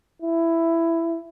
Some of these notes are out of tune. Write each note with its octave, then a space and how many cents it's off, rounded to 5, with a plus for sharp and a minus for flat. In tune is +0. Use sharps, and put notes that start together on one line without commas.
E4 +10